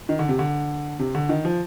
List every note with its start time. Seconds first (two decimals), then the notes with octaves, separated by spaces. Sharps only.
0.09 D#3
0.19 D3
0.29 C3
0.39 D3
0.99 C3
1.15 D3
1.29 D#3
1.45 F3